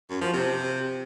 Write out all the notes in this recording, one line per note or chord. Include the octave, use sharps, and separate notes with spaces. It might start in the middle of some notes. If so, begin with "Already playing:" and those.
F#2
F3
C3